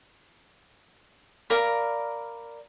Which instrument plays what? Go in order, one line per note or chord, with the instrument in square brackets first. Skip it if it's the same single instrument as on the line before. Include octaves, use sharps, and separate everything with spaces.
[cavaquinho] A#4 D5 F5 B5